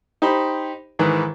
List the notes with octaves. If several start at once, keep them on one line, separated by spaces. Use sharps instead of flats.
D#4 G4 C5 B5
G#2 D#3 E3 B4